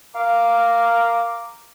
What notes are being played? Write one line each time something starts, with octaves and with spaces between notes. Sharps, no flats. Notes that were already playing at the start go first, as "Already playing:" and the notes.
A#4 F5 D6